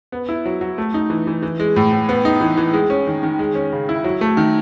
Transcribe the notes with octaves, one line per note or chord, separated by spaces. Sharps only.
B3
E4
F#3
F#3
A3
D#4
E3
E3
E3
G#3
A2
A2
B3
D#4
E3
E3
G#3
C#4
D#3
D#3
G#3
C#4
C#3
E4
F#3
A3
D#3